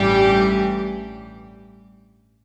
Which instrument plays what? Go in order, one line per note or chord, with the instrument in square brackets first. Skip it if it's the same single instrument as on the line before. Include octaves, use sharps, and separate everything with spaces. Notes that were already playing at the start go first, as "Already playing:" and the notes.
Already playing: [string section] A1 G2 E3 G3 G4